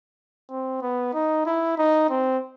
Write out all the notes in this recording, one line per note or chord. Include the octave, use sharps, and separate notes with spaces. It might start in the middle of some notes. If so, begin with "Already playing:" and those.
C4
B3
D#4
E4
D#4
C4